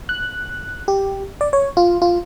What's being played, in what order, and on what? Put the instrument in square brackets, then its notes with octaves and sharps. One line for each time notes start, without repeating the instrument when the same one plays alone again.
[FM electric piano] F#6
G4
D5
C#5
F4
F4